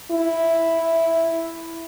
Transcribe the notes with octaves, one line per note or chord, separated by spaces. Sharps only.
E4